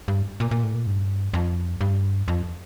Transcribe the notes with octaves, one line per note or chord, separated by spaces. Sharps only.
G2
A#2
A#2
A2
A#2
G2
F2
G2
F2